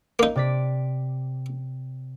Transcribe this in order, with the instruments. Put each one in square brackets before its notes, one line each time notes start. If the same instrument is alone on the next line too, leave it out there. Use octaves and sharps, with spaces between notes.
[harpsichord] A#3 D#4
[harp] C3 D5 B6